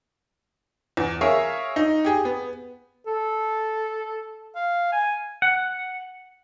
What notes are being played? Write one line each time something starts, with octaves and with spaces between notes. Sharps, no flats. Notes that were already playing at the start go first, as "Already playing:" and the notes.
E2
G#4 A#4 C#5 E5 F5
D#4
G4 G#4
B3
A4
F5
G#5
F#5